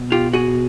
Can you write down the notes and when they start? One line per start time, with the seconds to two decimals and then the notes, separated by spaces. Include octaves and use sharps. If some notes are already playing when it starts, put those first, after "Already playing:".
Already playing: B2
0.12 F4 G4
0.33 F#4 G#4